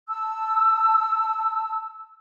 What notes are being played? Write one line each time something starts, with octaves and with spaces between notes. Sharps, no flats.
A5 E6